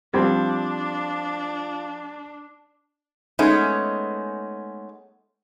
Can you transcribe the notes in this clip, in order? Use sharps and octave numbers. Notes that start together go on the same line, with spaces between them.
F3 G3 C4 D4 G#6
G#3 A3 B3 C#4 D#4